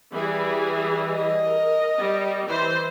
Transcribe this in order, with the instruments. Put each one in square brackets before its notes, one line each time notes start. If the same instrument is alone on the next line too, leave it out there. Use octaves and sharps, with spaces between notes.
[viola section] E3 G3 G#4
[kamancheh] D#5
[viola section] A#4
G3
E3 C5